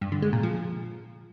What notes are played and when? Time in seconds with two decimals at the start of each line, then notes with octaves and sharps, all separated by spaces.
0.01 G2
0.12 D3
0.22 G#3
0.33 A#2
0.43 F3